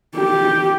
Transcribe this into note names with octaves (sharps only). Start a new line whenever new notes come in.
G4